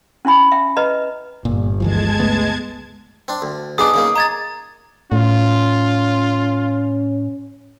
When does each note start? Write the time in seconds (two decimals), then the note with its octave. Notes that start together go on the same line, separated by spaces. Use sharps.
0.25 C#4 E4 G#5 B5
0.52 E5 G5
0.77 B4 D#5 A#5
1.45 G1 A#2
1.80 D2 E3 F3 G#3 A5 G#6
2.19 C#2 A3 B3
3.28 C4 D4
3.42 D2
3.78 B3 D4 D#4 G#4 D6 D#6
3.94 C#3 A#3 D#4
4.16 D#5 A#5 G#6 A6
5.12 A2 C#4 F4